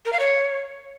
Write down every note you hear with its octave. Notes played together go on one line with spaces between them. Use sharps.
A#4
F5
C#5